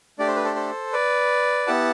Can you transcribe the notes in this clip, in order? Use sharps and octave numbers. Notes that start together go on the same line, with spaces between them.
A3 D4 G4 D5
C5
B4
A4 C5
A4 C5
B4 D5
B3 E4 G4 F#5 A5